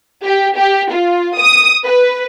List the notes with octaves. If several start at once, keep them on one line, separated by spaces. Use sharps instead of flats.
G4
G4
F4
D#6
B4